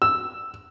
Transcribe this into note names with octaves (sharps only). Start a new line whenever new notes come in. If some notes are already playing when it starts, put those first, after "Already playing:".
E6